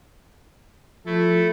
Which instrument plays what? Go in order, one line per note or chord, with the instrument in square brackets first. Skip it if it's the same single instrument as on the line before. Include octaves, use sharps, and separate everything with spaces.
[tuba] F3 [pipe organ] A3 E4 A4